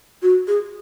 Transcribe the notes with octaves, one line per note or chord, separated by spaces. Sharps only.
F#4
G#4